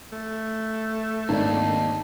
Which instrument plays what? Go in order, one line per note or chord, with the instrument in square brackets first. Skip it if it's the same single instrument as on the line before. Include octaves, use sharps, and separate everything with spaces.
[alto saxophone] A3
[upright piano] G#1 D4 [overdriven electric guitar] D#2 [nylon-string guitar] A5